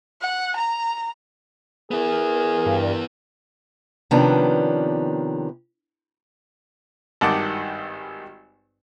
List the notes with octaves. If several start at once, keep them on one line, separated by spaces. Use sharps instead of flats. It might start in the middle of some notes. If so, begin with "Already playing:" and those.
F#5
A#5
B3 E4 G#4 A#4
G2
C3 D#3 F3 B3 C#4 D4
G#1 G2 D#3 F#5 A5 D6